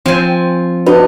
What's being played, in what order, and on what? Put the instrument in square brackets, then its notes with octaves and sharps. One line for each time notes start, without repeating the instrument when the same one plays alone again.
[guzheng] F3 G#5 [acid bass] C4
[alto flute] D4 [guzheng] D#4 [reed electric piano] F#4 B4